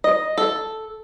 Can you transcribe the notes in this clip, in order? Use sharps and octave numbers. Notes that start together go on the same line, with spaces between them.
D#5
A4